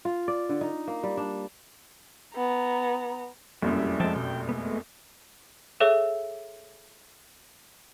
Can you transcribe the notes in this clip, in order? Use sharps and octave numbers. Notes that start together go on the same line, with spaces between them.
F4
D5
D3
D#4
A#3
G3
D4
B3 A#5
F1 A#1 F#2 G3 E4
F3 G#3 E5 G5 A5
B2 G5
G#3 A3 B3
G#4 A4 C#5 E5 E6